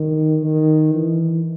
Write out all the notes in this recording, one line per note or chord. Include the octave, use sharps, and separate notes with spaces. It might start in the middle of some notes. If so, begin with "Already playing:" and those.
Already playing: D#3
D#3
E3